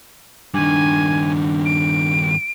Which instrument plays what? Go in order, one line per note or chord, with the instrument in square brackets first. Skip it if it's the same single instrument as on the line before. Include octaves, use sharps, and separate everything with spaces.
[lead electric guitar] G2 D#3 [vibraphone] D4 [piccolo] G#5
[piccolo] D7